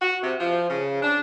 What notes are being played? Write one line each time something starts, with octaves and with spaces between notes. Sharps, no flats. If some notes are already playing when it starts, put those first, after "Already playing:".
F#4
C3
F3
C#3
D4